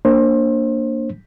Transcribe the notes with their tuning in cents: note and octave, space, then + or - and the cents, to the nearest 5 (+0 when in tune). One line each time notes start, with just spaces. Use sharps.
A#3 +0 D4 +0 C5 +35